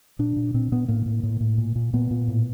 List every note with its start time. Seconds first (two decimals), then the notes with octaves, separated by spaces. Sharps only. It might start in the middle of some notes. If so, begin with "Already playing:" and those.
0.19 A#2 D4
0.36 A#2
0.54 A#2 C4
0.72 A#2 B3
0.88 A2 A#3
1.06 A2
1.23 A2
1.41 A2
1.58 A#2
1.76 A#2
1.94 A#2 B3
2.11 A#2
2.28 A2